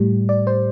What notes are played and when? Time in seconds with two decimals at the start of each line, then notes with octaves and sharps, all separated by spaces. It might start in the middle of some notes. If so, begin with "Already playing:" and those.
Already playing: A2 G3
0.29 D5
0.47 C5